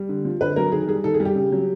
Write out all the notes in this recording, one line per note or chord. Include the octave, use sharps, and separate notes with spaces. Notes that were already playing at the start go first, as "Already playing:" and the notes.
Already playing: G3
D3
F3
D3 B4
F#3 A#4
D#3 G#4
G3 G#4
D#3 A4
G#4
G3
G4
C#3
F#3